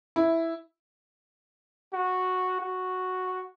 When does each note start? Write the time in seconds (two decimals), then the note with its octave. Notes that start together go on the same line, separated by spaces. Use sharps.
0.16 E4
1.94 F#4
2.61 F#4